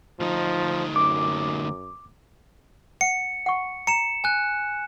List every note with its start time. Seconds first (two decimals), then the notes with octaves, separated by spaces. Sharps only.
0.20 D2 F3 D#4
0.96 F#2 D6
3.01 F#5 C#7
3.46 F#5 C#6
3.87 A#5 C#7 E7
4.24 G#5 F#6